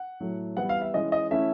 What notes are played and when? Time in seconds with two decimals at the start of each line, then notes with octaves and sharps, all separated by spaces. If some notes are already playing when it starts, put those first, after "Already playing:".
Already playing: F#5
0.20 A2 F#3 A3
0.57 E3 G3 B3 E4 F#5
0.69 F5
0.81 E5
0.94 E3 G#3 C#4 D#5
1.12 D#5
1.31 E3 A3 C#4 E4 E5